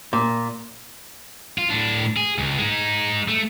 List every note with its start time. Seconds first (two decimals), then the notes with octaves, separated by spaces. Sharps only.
0.13 A#2
1.58 F4
1.70 A2 D4
2.17 G#4
2.38 C#2
2.58 G#3 D#4
3.28 A3